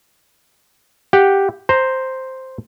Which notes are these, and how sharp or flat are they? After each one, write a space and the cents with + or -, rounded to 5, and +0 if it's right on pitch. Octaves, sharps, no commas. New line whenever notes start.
G4 +0 F#5 +0
C5 +0 A#5 +0